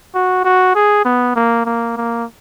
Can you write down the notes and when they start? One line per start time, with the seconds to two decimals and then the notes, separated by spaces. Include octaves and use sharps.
0.14 F#4
0.44 F#4
0.75 G#4
1.05 B3
1.36 A#3
1.65 A#3
1.97 A#3